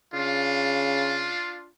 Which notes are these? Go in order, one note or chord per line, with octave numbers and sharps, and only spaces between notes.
C#3 D4 F4